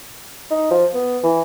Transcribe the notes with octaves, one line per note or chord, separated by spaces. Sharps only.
D#4
F3
B3
E3